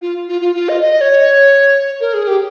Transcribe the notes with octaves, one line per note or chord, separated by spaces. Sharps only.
F4
F4
F4
F4
D#5
D#5
C#5
A#4
G#4
G4